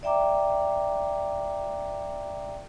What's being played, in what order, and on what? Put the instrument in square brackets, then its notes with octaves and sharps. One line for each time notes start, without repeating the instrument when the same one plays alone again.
[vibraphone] D5 E5 G5 A#5 D6